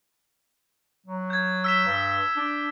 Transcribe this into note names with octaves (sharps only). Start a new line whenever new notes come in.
F#3
G6 G#6
E6 B6 E7
G2
D4